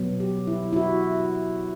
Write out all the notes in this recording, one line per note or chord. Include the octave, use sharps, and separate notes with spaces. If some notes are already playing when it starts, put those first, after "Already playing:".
Already playing: B2 F#3 B3
G4
E4
E4
F#4